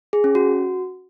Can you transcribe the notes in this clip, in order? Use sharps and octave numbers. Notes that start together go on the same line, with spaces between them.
G#4
C#4
F#4